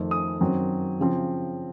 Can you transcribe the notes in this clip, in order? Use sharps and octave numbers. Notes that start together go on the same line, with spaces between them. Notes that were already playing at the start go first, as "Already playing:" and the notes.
Already playing: F2 D#3 A3
D#6
F#2 D#3 F#3 C4
C#3 F3 C4